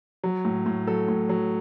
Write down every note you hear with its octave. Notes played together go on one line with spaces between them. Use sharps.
F#3
A2
A2
F#3 A4
A2
F#3